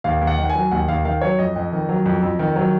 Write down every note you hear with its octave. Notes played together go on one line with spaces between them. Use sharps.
D#2 F5
D#2
F#5
D#3
F#5
G#5
F#3
D#2 F#5
D#2 F5
D#3 F5
F#3 C#5
F2 D#5
F2
D#3
F#3
F2
F2
D#3
F#3